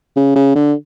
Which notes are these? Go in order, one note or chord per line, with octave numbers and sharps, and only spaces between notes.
C#3
C#3
D3